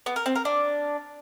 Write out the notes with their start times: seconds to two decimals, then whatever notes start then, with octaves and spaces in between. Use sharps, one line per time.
0.06 B3
0.16 A#4
0.26 C4
0.35 A#4
0.45 D4